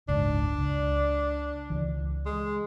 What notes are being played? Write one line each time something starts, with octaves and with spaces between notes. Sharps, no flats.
F#1 C#2 G#2 D4
C#2
C#2 E3
G#3